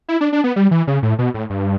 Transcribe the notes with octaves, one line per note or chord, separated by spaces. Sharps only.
E4
D4
D4
B3
G3
E3
C#3
A2
B2
A2
G2